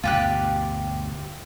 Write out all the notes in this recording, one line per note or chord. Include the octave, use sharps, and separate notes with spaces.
D2 G2 B2 F4 G4 F#6